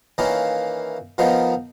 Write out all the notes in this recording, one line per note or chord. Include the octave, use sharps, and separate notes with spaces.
D#3 E3 A#3 C#4 E4 F4
D#3 F3 B3 C4 D#4 F4